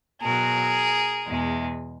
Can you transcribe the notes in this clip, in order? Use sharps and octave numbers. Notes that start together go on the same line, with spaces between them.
B2 F#3 G#4 A#4
E2 B2 G#3